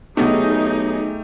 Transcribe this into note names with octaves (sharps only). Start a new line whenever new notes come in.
B1 C3 A3 B3 D4 D#4 G4 G#4